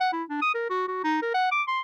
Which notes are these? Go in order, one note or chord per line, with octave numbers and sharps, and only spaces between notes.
F#5
E4
D4
D#6
A#4
F#4
F#4
D#4
A#4
F#5
D6
C6